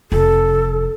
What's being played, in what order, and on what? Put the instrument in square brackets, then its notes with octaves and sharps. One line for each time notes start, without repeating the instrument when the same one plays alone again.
[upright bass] F1 [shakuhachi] A4